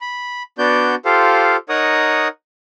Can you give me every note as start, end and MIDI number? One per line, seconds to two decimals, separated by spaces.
0.01 0.43 83
0.58 0.95 59
0.58 0.95 62
0.58 0.95 66
0.58 0.95 74
0.58 0.95 91
1.05 1.57 65
1.05 1.57 67
1.05 1.57 69
1.05 1.57 72
1.05 1.57 77
1.69 2.28 63
1.69 2.28 70
1.69 2.28 73
1.69 2.28 78
1.69 2.28 87